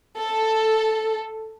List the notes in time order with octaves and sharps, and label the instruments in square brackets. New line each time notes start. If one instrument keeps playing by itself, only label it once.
[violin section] A4